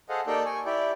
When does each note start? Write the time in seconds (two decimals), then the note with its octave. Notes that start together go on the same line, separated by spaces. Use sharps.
0.09 G#4 A4 C5 D#5 F5 F#5
0.27 A#3 D#4 G4 A4 D5 G5
0.46 G#5 C#6
0.66 E4 G4 D5